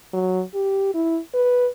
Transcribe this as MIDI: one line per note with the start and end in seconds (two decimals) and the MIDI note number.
0.14 0.42 54
0.54 0.92 67
0.94 1.19 64
1.34 1.68 71